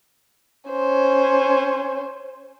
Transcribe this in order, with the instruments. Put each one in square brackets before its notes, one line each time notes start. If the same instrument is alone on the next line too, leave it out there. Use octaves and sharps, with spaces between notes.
[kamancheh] C#4 C5